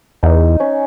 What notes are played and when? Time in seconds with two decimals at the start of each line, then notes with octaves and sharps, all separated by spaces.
0.23 E2 D#4
0.60 C#4